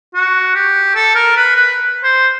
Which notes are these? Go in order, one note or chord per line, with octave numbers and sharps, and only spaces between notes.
F#4
G4
A4
A#4
B4
B4
C5